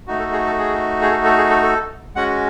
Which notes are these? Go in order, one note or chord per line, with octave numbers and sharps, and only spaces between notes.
A3 D#4 F#4
A4
G#4
A4
G#4
G#4
A4
A4
G#4
A4
A4
G#3 C#4 F#4 F#5